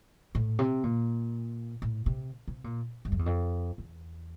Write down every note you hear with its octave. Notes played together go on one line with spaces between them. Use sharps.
A2
C3
A#2
A2
C3
C3
A#2
G2
F2
E2
F2
E2